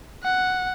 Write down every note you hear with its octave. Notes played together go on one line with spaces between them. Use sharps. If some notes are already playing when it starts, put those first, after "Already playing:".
F#5